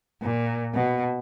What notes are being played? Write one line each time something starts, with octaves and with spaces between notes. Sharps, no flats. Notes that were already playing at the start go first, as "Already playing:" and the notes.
A#2
B2